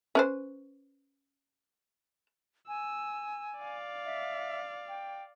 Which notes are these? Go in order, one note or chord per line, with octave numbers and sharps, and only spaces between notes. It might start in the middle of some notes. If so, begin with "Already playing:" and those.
C#4 B4 C5
G#5 E6
D5 F5
E5
G5